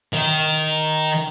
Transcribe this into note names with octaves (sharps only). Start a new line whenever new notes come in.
D#3